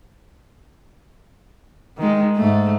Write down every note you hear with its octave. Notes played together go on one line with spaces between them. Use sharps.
D#3 G#3
G#2 A3